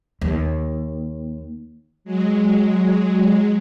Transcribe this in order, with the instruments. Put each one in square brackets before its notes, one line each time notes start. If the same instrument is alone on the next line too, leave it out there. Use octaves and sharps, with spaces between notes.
[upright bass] D#2
[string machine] F#3 G#3